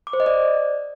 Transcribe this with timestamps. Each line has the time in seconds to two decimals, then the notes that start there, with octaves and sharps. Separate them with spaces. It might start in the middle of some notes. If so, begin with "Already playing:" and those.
0.07 D6
0.13 C5
0.20 D#5
0.26 D5